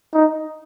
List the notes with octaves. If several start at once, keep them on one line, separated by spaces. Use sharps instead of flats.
D#4